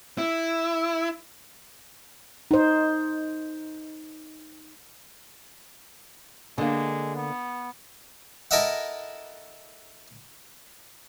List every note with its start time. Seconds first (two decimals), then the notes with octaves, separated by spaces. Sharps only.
0.18 E4
2.51 D#4 C5
6.58 D3 G#3 A#3
7.16 B3
8.51 E4 A4 A#4 D#5 E5 F#5